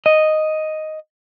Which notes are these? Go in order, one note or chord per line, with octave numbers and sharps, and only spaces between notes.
D#5